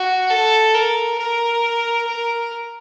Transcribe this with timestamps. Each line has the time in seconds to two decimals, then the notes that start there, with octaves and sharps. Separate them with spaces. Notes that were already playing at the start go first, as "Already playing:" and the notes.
Already playing: F#4
0.30 A4
0.74 A#4
1.18 A#4
2.07 A#4